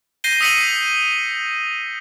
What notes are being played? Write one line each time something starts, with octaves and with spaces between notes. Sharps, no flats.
G6 A#6 C7 D#7 G7
D#6 E6 B6 C#7 D#7 F#7